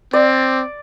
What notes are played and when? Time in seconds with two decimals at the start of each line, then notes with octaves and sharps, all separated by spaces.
0.13 C4 D5